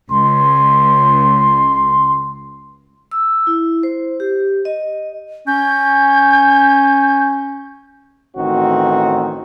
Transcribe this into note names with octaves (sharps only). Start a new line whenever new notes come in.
C#2 C6
E6
E4
C5
G4
D#5
C#4 G6
A1 D#3 C4 F#4